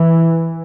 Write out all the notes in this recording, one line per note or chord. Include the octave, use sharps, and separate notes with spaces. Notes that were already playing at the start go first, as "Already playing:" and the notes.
Already playing: E3